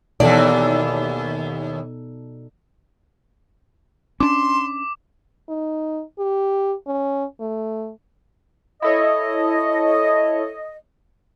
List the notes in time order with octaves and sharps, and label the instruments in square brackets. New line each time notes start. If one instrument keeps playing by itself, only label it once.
[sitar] D#2 E3 [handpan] B2 D#4 A4 [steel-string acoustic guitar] D5
[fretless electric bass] C#4 D4 [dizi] C6 [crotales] D6
[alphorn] D#4
G4
C#4
A3
[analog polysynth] E4 A4 C#5 [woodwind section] D#5